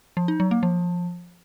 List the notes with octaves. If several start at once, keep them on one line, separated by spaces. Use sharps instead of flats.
F3
D#4
F#3
A#3
F3